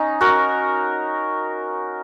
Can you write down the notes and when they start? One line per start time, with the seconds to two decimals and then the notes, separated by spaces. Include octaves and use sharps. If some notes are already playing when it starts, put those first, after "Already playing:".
Already playing: C#4 D#4
0.21 F#4 A#4